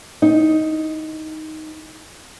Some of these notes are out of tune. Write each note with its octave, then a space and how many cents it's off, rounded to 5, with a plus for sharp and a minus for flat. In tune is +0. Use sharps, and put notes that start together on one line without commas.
D#4 +10